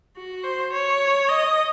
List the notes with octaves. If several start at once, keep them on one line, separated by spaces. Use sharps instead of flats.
F#4
C5
C#5
D#5